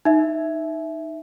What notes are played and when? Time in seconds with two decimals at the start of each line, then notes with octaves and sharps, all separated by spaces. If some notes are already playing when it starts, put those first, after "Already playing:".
0.05 D#4 E5